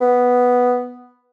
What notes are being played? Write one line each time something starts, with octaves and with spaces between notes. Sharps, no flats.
B3